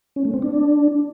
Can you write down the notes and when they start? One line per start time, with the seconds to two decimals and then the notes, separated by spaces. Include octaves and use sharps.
0.16 C#4
0.25 A3
0.34 C4
0.42 D4